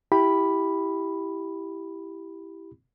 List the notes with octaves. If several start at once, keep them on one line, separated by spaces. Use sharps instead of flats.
E4 G4 B5